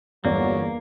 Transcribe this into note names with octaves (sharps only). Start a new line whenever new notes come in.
G1 E2 F#3 A#3 D5